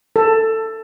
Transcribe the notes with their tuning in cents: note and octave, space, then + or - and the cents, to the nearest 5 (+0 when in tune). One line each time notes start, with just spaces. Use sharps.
A4 +15